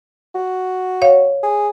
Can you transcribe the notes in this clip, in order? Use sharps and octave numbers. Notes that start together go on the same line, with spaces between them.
F#4
C#5 F5
G#4